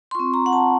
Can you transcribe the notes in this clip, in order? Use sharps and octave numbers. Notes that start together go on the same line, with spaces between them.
C6
C4 F4 C#6
A#5
F#5
A5